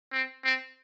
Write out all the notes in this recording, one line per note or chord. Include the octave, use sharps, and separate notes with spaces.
C4
C4